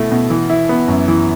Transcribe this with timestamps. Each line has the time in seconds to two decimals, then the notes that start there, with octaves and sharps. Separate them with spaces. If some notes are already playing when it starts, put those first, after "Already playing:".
Already playing: B2 A3 E4
0.11 B2
0.30 E3
0.50 E4
0.69 B3
0.88 F#2
1.08 E3